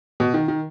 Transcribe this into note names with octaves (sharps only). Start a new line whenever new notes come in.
B2
D#3
D#3